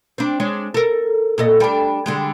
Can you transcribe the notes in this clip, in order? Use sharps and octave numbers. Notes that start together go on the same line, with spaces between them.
C4 D4
G#3 D4 C#5
A4 A#4
A#2 A4 D#5
G3 D4
D3 G3 G#3